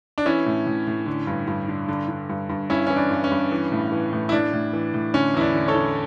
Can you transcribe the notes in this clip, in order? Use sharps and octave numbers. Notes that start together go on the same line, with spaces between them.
D4
E3 C#4 E4
A2
A2
A2
D3
G2
G2
D3
D3
D3
G2
G2
G2 C#4 E4
E3 C#4
D4
G2
C#4
G2
E3
A2
E3
A2
E4
A2 D4
A2
E3
A2
D3 C#4
E2 E4
D4
D3
A4 C#5
D3